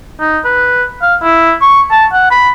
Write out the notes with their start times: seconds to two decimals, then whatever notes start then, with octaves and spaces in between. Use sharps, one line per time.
0.20 D#4
0.45 B4
1.02 F5
1.23 E4
1.62 C#6
1.91 A5
2.12 F#5
2.31 B5